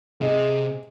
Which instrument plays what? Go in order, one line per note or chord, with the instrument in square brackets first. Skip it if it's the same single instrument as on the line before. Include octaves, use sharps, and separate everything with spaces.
[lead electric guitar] C3 [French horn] G#4 [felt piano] D#5